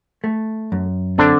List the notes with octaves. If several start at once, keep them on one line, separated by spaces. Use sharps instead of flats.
A3
F#2
D3 C4 D4